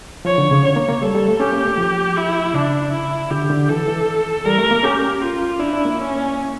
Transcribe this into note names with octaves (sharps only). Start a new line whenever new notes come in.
F3 C#5
D3
C#3
D3 C#5
A#3
A#3
G3 A4
G3
A3
C#4 G4
A#3
A3
F3
E4
C#3 D4
E4
D3 G4
D3
E3 A4
E3
G3 A#4
A3
A#3
C#4 G4
F4
D4 E4
D4
A#3
C#4